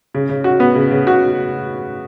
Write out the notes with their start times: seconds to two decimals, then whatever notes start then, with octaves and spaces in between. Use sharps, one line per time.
0.14 C#3
0.29 C#3
0.44 F#4
0.60 B3
0.75 C#3
0.91 C#3
1.07 F#4